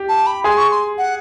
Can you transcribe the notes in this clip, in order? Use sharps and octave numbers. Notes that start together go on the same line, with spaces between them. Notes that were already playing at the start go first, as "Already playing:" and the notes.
Already playing: G4
A5
B5
G#4 C6
C#6
C6
F#5